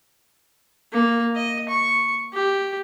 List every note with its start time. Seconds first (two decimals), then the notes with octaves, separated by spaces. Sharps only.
0.92 A#3
1.35 D#5
1.69 C#6
2.33 G4